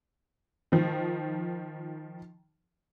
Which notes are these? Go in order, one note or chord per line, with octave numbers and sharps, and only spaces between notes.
D#3 F3